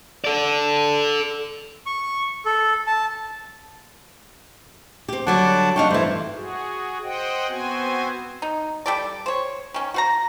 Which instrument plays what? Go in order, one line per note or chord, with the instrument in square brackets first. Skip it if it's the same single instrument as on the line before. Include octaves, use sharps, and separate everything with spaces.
[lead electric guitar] A4 D5
[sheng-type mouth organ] C#6
A4
A5
[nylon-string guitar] C4 G4
[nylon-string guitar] D3 F#3 G3 [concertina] F#5 A5 D6
[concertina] D4 C#6 [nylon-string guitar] D#4 F5 G5
[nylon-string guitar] G2 E3 [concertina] A3 C5
[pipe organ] F#4 G#4
C5 D#5 F#5 G5
B3 C4 F#4 C5 G#5
[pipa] D#4
G3 A4 D5
C5 C#5
D#3 C#4
F#4 C5 A#5